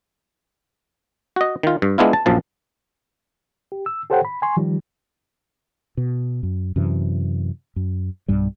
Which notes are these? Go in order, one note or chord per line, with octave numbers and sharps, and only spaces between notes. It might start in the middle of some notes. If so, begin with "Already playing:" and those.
F#4 D#5
D#3 F4
G2
G#3 B3 D4 E4 F4
A5
A#1 F#2 F3 A5
G4
E6
G4 A4 C5 C#5 F#5 G5
B5
G#5 C6 C#6
D#3 F3 G3
B2
F#2
F#2 C3 E3
F#2
B1 G2 G3